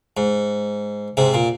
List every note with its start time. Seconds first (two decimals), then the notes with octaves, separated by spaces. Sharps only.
0.17 G#2
1.17 G#2 C3
1.34 A#2